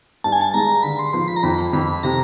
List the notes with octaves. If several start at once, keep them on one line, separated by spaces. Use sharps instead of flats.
G2 A5
G#5
A5
G#3 A#5
D3 B5
C6
F3 C6
B5
A#5
F2 B5
F2 B5
C3 A#5